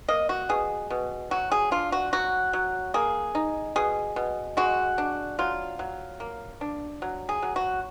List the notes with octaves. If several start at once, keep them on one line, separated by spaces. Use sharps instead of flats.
A#3 D#5
F#4
B2 G#4
B2
F#3 F#4
G#4
D4 F4
F#4
F#3 F#4
F#3
A#3 G#4
D#4
B2 G#4
B2
G#3 F#4
D4
F#3 F4
F#3
A#3
D4
F#3
G#4
F#3
F#4